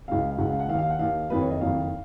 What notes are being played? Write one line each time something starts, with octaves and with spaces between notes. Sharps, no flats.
C#2 C#3 F5
F5
C#2 C#3 F#5
F5
F#5
D#2 D#3 F5
F5
F#5
D#2 D#3 F5
F#1 F2 D#3 B4
C#5
D#5
F#1 F2 D#3 F5